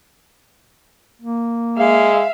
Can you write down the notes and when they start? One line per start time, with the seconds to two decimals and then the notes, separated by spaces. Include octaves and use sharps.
1.22 A#3
1.77 G#3 E5 F5